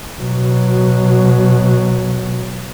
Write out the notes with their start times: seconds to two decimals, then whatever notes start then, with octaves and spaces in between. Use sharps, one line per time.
0.19 B2 F#3